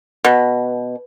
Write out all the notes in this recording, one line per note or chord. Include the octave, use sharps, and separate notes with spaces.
B2